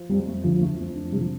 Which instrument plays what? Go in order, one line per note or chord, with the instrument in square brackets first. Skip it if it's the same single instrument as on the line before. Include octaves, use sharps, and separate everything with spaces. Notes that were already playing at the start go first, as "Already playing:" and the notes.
Already playing: [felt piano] F3
[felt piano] F2 [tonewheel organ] G3
[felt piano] A3
[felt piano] D2 [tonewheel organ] F3
[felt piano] A3
F2
D4
[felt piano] C3 [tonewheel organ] G3
[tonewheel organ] F3